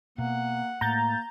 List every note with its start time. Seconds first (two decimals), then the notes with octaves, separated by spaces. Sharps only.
0.18 B2 A#3 F#5
0.81 A2 A#3 A#5 G6 A6